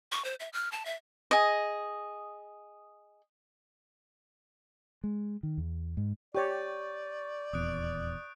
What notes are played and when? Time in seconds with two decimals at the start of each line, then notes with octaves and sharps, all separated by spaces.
0.12 C#6
0.25 C5
0.40 E5
0.53 F6
0.72 A5
0.85 E5
1.31 G#4 D#5
5.04 G#3
5.43 D#3
5.58 E2
5.97 G#2
6.35 G4 C#5 D5 C#6 G6 A6
7.53 D#1 E2 D#6 F#6 D7